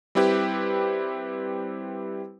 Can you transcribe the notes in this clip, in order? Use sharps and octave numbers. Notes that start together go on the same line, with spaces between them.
G3 C4 E4 G4 B4